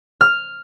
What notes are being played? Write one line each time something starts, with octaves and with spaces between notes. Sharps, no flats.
F6